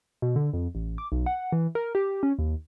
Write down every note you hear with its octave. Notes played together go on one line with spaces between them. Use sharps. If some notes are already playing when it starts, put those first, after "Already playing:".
B2
D3
F2
A1
D6
B1
F#5
E3
A#4
G4
C#4
D#2